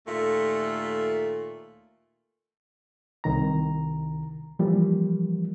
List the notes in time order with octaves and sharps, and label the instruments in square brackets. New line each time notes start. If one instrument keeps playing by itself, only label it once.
[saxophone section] D#2 A#2 A3
[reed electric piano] C2 D#3 A#5
E3 F3 G3 A#3